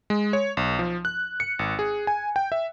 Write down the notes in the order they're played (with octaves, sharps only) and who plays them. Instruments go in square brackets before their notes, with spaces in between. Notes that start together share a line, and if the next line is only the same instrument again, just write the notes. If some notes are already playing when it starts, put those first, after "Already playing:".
[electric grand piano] G#3
C#5
B1
F3
F#6
C#7
G#1
G#4
G#5
G5
E5